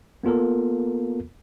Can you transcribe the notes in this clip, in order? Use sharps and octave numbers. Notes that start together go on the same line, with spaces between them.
A#3 B3 F4 A4 A#4